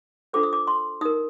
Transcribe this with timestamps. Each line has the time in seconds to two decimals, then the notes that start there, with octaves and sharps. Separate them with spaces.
0.33 D4 F4 A4 C5 D6
0.43 D#6
0.53 D6
0.67 C6
1.01 D#4 A#4 D#6